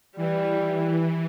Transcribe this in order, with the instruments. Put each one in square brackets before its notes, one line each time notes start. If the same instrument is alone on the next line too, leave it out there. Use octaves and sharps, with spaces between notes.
[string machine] E3 [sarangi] G3